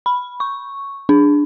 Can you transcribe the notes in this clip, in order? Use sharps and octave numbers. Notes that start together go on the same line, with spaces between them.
B5
C#6
D4